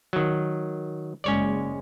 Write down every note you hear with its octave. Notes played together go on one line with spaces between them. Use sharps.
D#3 F#3
F#1 G#3 C#4 C#5 D5